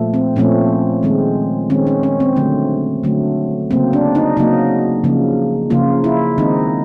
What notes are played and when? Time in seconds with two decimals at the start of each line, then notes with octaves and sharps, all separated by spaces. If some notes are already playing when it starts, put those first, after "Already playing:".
Already playing: A#2 F3 A3
0.14 C4
0.36 A#2 F3 A3 C4 C#4
1.03 D#3 G#3 C4
1.70 D#3 G#3 C4 C#4
1.87 C#4
2.03 C#4
2.20 C4
2.36 D3 F#3 A3 C#4
3.03 D3 F#3 A3
3.71 C#3 F#3 A#3 C4
3.93 D4
4.15 D#4
4.37 C#3 F#3 A#3 D#4
5.04 C#3 F3 A#3
5.70 C#3 F3 A#3 F4
6.04 E4
6.38 D#3 G#3 C4 D#4